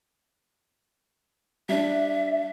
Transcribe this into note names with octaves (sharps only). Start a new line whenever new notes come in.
G3 D4 E5